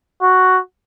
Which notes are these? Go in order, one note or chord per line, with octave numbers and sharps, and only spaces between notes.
F#4